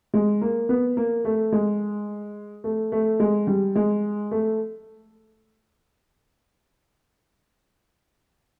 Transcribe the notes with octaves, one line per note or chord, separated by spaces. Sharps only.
G#3
A#3
B3
A#3
A3
G#3
A3
A3
G#3
G3
G#3
A3